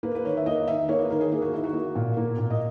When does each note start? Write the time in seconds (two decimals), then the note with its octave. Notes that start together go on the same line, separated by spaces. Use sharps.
0.03 A#3 B4
0.15 B4
0.25 D#3 C#5
0.37 E5
0.46 A#3 D#5
0.67 D#3 E5
0.89 A#3 C#5
0.99 B4
1.11 D#3 A#4
1.20 G#4
1.32 A#3 G#4
1.42 F#4
1.53 D#3 E4
1.64 F#4
1.74 A#3
1.96 A#2
2.17 A#3
2.38 A#2
2.50 D#5